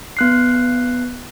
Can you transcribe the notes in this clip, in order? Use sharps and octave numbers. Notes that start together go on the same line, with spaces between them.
B3 F#6 C7